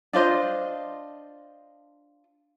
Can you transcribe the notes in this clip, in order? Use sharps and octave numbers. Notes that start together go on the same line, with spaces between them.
D4 F4 C5 D#5